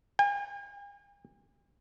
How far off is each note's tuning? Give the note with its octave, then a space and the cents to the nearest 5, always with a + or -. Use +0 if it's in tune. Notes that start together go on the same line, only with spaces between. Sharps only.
G#5 -45